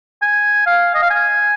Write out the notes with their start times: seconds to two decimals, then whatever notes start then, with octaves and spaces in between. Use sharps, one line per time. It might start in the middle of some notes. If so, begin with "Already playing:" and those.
0.22 G#5
0.67 F5
0.95 D#5
1.03 F5
1.10 G#5